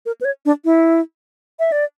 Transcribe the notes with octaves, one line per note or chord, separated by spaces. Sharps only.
A#4
B4
C#5
D4
E4
E5
D5